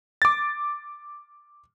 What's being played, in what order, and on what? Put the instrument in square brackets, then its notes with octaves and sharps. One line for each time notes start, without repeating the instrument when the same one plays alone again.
[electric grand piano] D6 A6